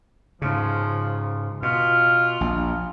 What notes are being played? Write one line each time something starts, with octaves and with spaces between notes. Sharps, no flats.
G#2 C#3 F3
B2 F4
A#1